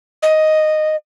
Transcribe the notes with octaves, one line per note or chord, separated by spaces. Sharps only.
D#5